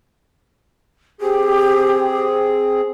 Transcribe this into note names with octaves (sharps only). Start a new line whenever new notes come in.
C4 G4 G#4